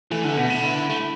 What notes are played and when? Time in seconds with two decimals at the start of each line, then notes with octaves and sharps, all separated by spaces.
0.11 E3 A3
0.24 D3 A3
0.37 B2 B3
0.50 D3
0.64 E4
0.90 A3